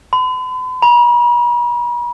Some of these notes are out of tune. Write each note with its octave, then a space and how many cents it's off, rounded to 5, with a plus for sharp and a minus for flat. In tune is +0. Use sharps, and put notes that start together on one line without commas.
B5 +45
B5 -45